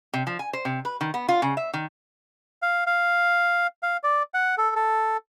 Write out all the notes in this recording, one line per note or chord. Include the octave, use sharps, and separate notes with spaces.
C3
F3
G#5
C5
C3
B4
D#3
B3
F4
C#3
E5
D#3
F5
F5
F5
D5
F#5
A4
A4